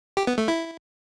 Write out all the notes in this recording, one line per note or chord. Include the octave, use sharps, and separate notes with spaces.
G4
B3
A3
E4